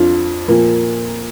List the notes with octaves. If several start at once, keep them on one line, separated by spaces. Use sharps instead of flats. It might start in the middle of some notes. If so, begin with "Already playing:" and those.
Already playing: F2 F3 D4 F4
A#2 F3 A#3